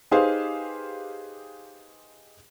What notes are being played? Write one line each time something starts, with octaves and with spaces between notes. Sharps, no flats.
D#4 G4 G#4 B4 C5 F5